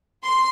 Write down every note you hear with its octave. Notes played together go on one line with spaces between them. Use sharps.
C6